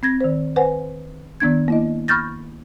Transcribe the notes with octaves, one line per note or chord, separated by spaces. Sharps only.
C4 G#6 A#6
D#3 C5
B4 C5 F#5 G#5
D#3 B3 D4 G#6
A#3 E4 D#5
B5 C#6 F6 G6 A6 A#6